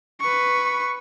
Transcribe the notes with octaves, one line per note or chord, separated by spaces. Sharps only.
B4 C#6